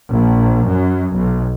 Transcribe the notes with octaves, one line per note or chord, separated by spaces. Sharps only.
A#1
F#2
B1